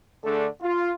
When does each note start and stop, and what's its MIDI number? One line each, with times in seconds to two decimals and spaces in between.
0.24 0.47 50
0.24 0.47 57
0.24 0.47 62
0.24 0.47 68
0.24 0.47 69
0.24 0.47 74
0.62 0.92 65